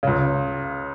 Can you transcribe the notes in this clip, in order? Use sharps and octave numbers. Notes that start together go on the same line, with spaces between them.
C#2 C#3